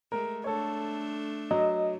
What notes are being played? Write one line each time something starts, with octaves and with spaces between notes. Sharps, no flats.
G#3 A3 A#4
A3 D4 A4 C#5
F#3 D#5